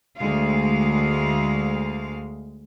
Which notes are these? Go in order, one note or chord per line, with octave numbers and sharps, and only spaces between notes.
D2 G#3 F5